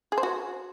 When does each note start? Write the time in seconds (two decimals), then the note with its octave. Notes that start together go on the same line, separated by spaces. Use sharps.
0.12 G#4
0.18 C5
0.23 F#4